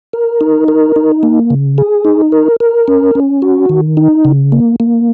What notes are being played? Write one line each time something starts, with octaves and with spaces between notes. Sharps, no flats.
A#4
D#4
A#4
D#4
A#3
C#3
G#4
D#4
A#4
A#4
C#4
C#4
F#4
D#3
D#4
C#3
A#3
A#3